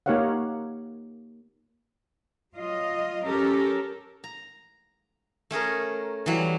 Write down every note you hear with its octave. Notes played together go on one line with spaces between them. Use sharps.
A#3 D#4 G4 C#5 F5 F#5
F#3 F4 D#5
C#4 G4 A4 A#4
A#5
A3 C#4 G#4 A#4
E3 F#3 G3